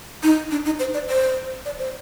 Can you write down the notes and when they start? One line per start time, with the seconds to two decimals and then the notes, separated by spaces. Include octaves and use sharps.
0.23 D#4
0.51 D4
0.66 D#4
0.79 C5
0.94 D5
1.08 C5
1.65 D5
1.79 C5